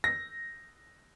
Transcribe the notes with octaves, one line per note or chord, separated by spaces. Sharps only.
A#6